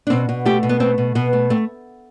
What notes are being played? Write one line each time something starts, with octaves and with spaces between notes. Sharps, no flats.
D4
B2 C4
B2
A3 G4
B2
B3
A3 C4
B2
B2 B3
A3
A3 C4